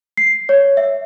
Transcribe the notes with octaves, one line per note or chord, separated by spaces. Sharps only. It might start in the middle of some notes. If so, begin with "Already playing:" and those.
C7
C#5
E5